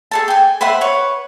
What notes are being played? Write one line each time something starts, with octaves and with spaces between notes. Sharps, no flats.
G#4 A4 A5
G5 G#5
B4 C5 E5 F#5
B4 C#5 C#6